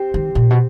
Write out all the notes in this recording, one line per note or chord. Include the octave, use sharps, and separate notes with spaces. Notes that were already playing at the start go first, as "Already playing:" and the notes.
Already playing: C4 G4
D#3
A#2
B2